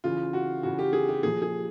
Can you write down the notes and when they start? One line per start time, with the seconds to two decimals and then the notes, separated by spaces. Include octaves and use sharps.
0.04 C#3 E3 F4
0.33 F#4
0.63 C#3 E3 F#4
0.79 G4
0.93 G#4
1.08 G4
1.23 A#2 F3 G#4
1.42 G#4